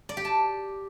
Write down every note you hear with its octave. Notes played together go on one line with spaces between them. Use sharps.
D5
G4
A5